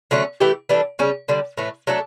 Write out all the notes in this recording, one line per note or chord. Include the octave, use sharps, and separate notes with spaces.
D3 F#3 A3 C#4
E3 A3 E4 G4
E3 G3 D4 A4
C#3 G3 C#4
D3 G3 D4
A2 E3 A3
F#3 A3 D4 A4